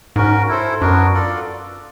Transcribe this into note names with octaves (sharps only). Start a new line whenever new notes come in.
G#2 C#4 F#4 A#4
E4 A4 C5
F#2 B3 D4 F#4 A#4
F4 A4 D5